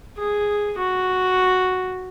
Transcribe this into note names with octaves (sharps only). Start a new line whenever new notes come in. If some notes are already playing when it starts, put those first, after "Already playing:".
G#4
F#4